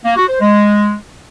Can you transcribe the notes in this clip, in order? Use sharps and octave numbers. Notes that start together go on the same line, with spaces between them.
A#3
F#4
C5
G#3